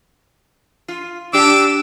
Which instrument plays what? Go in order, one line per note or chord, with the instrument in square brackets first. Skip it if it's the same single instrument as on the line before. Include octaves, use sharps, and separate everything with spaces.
[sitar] F4
[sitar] D4 G4 [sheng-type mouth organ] D6 E6